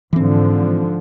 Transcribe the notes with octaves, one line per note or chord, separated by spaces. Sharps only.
G#2 D3 E3 F3 C4